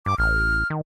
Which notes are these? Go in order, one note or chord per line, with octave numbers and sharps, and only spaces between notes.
G2 D6
A1 F6
D#3